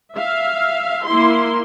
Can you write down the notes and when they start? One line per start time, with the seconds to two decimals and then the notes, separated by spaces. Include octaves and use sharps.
0.16 E5 F5
1.07 A#3 E4 C6